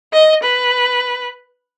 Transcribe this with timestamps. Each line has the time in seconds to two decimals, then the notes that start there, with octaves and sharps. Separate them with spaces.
0.13 D#5
0.42 B4